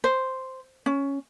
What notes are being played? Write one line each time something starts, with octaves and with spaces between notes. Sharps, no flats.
C5
C#4